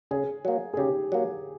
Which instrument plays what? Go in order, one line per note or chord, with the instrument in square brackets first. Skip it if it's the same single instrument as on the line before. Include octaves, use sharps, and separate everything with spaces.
[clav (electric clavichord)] C#3 [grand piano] G#4
[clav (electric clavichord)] F#3 A#3
[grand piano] G#4
[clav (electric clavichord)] C#3 [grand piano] G4
[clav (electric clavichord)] F#3 A#3